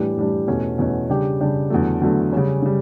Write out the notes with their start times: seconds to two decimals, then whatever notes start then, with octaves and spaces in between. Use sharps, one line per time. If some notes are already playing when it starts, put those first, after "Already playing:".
Already playing: A2 E3 G3 D4 G4
0.16 A2 E3 G3 D4 G4
0.47 E2 B2 A3 C#4
0.78 E2 B2 A3 C#4
1.09 C#3 G3 D4 G4
1.40 C#3 G3 D4 G4
1.70 E2 D3 F#3 A3
2.01 E2 D3 F#3 A3
2.33 C#3 G3 C#4
2.62 C#3 G3